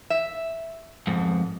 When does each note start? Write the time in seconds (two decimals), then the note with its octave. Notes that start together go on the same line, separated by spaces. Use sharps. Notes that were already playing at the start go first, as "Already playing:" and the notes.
0.10 E5
1.07 F2 G#2